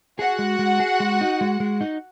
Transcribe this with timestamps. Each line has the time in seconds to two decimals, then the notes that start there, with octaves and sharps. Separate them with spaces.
0.19 F#4 G#4 F#5
0.39 G#3
0.59 G#3
0.80 G#4
1.00 G#3
1.21 D#4
1.41 G#3
1.60 G#3
1.81 D#4